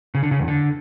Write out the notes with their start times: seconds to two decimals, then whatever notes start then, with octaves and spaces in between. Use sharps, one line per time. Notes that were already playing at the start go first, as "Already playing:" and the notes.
0.15 C#3
0.23 D3
0.31 C#3
0.40 E2
0.48 D3